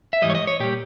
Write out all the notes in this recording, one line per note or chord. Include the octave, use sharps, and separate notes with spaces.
E5
G#2 E3 G3 D#5
C#5
D#5
C#5
A#2 G3 G4